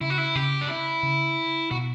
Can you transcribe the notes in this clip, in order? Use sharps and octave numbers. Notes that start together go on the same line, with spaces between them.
C#3 E4
F#4
E4
C#3 G4
D4
E4
C#3
B2 F#4